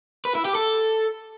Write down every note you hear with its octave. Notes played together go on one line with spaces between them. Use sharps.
B4
E4
G4
A4